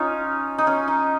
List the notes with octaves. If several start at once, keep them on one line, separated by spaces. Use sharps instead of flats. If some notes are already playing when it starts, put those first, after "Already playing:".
Already playing: C#4 D#4 F4
D#4
C#4
D#4